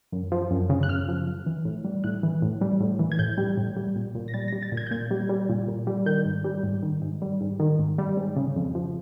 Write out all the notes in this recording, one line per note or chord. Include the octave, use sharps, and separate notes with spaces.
F#2
F3
F#2
C#3
F#6
F#2 F6
F3
F#2
E3
A2
G3
A2 F#6
E3
A2
G3
A2
E3
G#6
A2 G6
G3
A2
G3
A#2
A#2
A#6
G3 A6
G3 A#6
A6
A#2
G#6
G6
A#2 G#6
G3
G3
A#2
A#2
G3
D#3 G6
G#2
G3
G#2
D#3
G#2
G3
G#2
D#3
G#2
G3
G#2
C#3
F2
F3